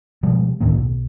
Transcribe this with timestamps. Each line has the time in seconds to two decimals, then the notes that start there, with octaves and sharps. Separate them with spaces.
0.23 B2 F3 G3 G#3
0.60 D2 A2 D#3 A#3
0.74 B1